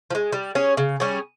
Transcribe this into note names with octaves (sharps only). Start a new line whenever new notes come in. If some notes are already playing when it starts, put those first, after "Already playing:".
F3
G#3
G3
C#4 G#4 C#5
C#3
G3 C#4 G#4